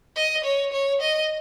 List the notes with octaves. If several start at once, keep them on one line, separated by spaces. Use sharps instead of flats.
D#5
C#5
C#5
D#5